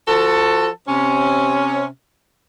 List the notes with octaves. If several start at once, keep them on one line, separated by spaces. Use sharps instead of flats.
F3 F#4 A4
C3 C#4